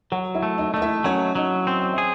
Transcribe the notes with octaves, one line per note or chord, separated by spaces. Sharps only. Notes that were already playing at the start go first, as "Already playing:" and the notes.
F#3 F#4 F#5
E4 E5
A3
D#4 D#5
A3 D#5
E4 E5
F#3 C#4 C#5
F#3 D#4 D#5
C4
F#5
G#4 E5